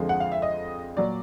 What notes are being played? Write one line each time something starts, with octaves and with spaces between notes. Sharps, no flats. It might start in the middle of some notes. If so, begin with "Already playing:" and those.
Already playing: F2 D3 F3 G#3
F#5
F5
E5
D#5
A#2 F#3 D5